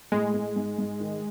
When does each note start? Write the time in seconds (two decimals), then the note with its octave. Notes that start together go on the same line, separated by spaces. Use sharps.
0.12 A2 G#3
0.34 A2
0.56 G#2
0.78 G#2
1.00 D#3